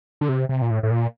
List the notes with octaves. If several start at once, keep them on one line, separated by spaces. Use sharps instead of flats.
D3
C3
C3
A#2
A2
A2
A#2